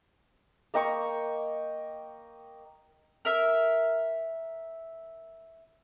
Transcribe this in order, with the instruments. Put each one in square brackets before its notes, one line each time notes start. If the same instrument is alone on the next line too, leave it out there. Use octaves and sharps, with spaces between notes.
[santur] A#3 D#5 G5 C#6
[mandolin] A#4 E5